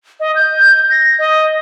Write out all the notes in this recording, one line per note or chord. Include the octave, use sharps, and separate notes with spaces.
D#5
G6
A#6
D#5